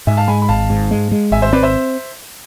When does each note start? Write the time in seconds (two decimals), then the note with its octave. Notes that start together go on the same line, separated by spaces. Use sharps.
0.07 G#2 E5 G#5
0.17 F5 A5
0.28 G#3 G#5 B5
0.42 B5
0.49 G#1 F5 A5
0.70 G#2
0.91 G#3
1.12 G#3
1.32 G#1 E5 G#5
1.42 C5 E5
1.53 C4 B4 D5
1.63 C5 E5